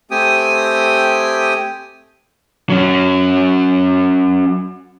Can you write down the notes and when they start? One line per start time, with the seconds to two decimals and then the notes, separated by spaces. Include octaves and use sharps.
0.11 A3 C4 G4 G5 G#5 D#6
2.70 F#3 C#4